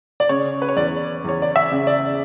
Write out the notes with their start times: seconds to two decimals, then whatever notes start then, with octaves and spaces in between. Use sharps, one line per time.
0.20 D5
0.29 C#3 C#5
0.62 B4
0.69 C#5
0.77 E2 D5
1.24 E2 C#5
1.42 D5
1.56 E5
1.72 C#3
1.87 D5